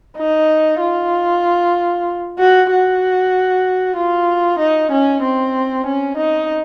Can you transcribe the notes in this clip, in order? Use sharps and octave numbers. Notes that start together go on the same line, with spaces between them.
D#4
F4
F#4
F#4
F4
D#4
C#4
C4
C#4
D#4